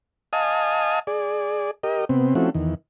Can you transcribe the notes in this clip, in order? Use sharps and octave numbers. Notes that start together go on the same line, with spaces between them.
D#5 F5 G#5 A5 D#6
G#4 D5
G4 A#4 D#5
C3 B3 C4
F3 A3 C4 C#4 E4 F#4
E2 D#3